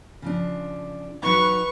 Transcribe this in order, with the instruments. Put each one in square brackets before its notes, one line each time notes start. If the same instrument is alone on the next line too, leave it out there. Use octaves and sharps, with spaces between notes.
[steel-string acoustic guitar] C#3 F3 D4
[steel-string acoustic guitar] F#3 D#4 [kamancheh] B4 C#6